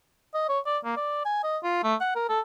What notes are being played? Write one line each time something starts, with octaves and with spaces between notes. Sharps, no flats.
D#5
C#5
D5
A#3
D5
G#5
D#5
F4
A3
F#5
A#4
A4